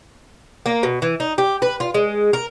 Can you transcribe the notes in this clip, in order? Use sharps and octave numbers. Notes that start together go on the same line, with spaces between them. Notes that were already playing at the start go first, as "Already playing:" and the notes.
A#3
B2
E3
D#4
G4
B4
F4
G#3
A#4